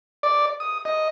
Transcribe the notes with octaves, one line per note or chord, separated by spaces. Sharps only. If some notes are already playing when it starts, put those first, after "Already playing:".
D5
D#6
D#5